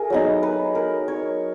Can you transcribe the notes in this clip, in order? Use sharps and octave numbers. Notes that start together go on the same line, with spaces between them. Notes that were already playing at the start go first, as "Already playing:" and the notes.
Already playing: A3 G#4 A#4
F#3 B3 D#4
B4
A#4
C#5